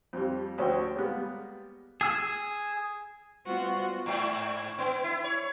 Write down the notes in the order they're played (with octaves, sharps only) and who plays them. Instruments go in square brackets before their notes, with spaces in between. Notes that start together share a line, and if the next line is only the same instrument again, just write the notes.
[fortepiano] F2 G3
D2 C#4 F#4 G5
G3 G#3 A#3 B3
[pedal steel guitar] G#4 E6
[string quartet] G3 B3 F4 F#4 C5
[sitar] G#2
B3
E4
C#5